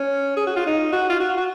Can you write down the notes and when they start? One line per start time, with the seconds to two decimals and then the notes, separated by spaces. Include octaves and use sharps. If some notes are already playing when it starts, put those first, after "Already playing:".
Already playing: C#4
0.37 G#4
0.47 F#4
0.56 F4
0.66 D#4
0.92 F#4
1.09 F4
1.20 F#4
1.37 F#4